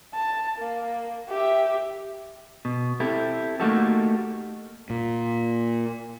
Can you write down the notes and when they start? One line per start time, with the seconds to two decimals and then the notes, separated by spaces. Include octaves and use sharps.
0.14 A5
0.59 A#3
1.29 G4 E5
2.65 B2
3.00 C4 E4 G4 A4
3.60 A3 A#3 D#4 F#4 G4 A4
4.90 A#2